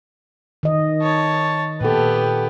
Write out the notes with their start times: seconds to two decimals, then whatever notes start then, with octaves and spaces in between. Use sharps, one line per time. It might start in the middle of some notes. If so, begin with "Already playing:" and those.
0.63 D#3 D#5
1.01 C#5 A5
1.81 A#2 B3 G4 A4